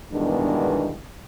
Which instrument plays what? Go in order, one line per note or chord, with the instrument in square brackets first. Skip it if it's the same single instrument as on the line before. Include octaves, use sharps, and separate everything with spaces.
[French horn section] E2 G2 B2 D#3 G#3 D4